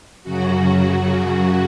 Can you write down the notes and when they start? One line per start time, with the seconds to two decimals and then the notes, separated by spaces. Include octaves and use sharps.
0.23 F#2 C#3 F#3 F#4
1.10 F#4